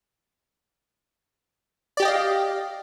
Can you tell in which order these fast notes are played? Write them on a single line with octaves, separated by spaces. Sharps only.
D5 G4 G5 D#5 F5